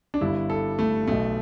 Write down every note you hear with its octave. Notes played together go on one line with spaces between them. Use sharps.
D4
G1 G2 D3 E4
A4
A3
B1 B2 A3